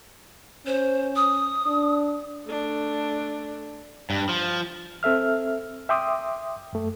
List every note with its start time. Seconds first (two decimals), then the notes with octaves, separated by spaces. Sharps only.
0.67 C#4 C5
1.16 D#6
1.66 D4
2.46 A3 D4
4.10 G2
4.29 F3
5.03 C4 A4 E5 F6
5.89 E5 G5 C6 D6 D#6
6.73 F#2 A3